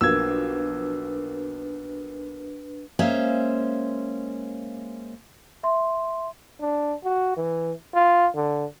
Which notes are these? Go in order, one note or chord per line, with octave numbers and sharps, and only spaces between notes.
B1 F3 A#3 D4 B4 E6 G#6
G#3 A#3 C#4 C5 E5 F5
E5 C6
D4
F#4
E3
F4
D3